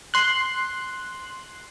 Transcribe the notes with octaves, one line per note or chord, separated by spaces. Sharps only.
C6 F#6